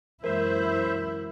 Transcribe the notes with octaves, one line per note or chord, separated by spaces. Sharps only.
F#2 E3 G#3 A#3 E4 A#4 C5 E5